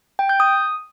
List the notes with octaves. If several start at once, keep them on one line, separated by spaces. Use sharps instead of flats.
G5
G6
D#6